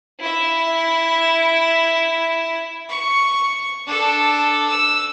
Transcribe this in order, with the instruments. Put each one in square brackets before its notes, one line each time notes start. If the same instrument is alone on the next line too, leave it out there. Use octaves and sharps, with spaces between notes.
[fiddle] E4 E5
[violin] C#6
D4 A4
E6